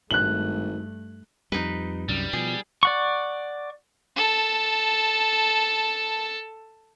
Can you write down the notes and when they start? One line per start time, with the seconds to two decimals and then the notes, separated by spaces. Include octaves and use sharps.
0.11 G#1 G2 A3 F#6 F#7
1.52 F2 G3 D#4 B4
2.09 C2 F#2 G3
2.33 B2 F3 G#4
2.83 D5 F#5 C#6
4.16 A4 A5